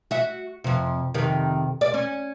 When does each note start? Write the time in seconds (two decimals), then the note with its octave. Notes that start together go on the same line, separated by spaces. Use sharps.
0.11 F#4 E5
0.64 F2 C3
1.14 F2 C3 D#3
1.81 D5
1.94 C#4